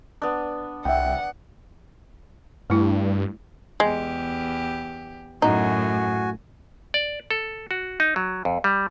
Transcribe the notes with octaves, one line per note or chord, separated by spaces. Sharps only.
B3 D4
C2 E5 F#5 G5
G2 A3 E4
E2 G#3 G4
F#2 A2 D#4 F#4 G#5
D5
A4
F#4
D#4
F#3
F2
G3